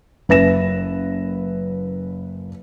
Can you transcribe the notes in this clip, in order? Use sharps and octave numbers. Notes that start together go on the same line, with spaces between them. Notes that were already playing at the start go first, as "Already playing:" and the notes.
F#1 B4 E5 A#6 E7